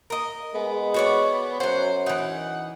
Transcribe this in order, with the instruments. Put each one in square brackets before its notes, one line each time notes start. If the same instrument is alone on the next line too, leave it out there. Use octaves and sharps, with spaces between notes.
[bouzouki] A#4 D#5
[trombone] G#3 [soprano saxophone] B3
[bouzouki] F#4 C#5 D5
[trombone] F#2 [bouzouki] F#3 F#5 [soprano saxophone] C5
[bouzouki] E3 D#4 [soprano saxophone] F#5